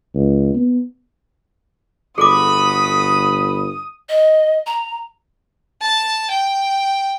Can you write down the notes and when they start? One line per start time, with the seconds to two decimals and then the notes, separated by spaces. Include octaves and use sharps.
0.15 C#2
0.55 B3
2.18 G1 A3 F#4 G#4 A4 B5 D6 D#6
4.09 D#5
4.66 A#5
5.82 A5
6.31 G5